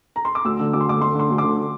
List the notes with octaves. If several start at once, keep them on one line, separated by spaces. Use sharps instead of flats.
A#5
C6
D6
D2 E6
D3
D2 D6
C6
D3 D6
D2 C6
D3 C6
D2
D6
D3